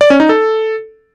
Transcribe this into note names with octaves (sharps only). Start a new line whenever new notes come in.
D5
C#4
D#4
A4